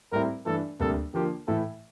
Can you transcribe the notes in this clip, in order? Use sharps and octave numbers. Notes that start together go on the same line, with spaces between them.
A2 G3 C4 E4 A#4
G2 E3 A3 D4 A4
D2 C3 G3 A#3 A4
D3 F3 A#3 F4 G4
A2 E3 A3 E4 A4